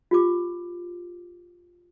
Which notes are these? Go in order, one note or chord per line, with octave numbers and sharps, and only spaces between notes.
F4 G4 D6